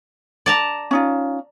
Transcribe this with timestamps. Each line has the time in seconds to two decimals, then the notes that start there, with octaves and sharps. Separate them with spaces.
0.46 D5 A5 A#5
0.91 C#4 D#4 F4